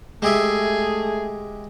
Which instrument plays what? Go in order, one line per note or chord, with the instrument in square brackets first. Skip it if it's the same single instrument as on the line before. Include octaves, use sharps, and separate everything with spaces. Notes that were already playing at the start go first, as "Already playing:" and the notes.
[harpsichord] G#3 G4 E5 [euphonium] A3 [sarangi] G#4